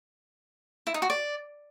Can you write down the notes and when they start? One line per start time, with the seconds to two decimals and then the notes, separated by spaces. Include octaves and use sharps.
0.87 E4
0.94 D#4
1.02 F#4
1.10 D5